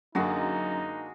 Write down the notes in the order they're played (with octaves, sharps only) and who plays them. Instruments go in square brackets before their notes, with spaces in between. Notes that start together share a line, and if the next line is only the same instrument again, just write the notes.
[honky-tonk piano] F#2 [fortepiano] D3 A#3 [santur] G#3 F#4 [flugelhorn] D#4